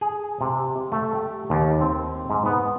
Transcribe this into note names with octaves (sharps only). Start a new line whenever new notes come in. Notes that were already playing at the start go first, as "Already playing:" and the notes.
G#4
C3
A3
G4
D#2
C4
G#2
B3